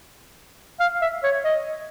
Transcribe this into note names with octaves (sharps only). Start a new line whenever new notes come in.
F5
E5
C#5
D#5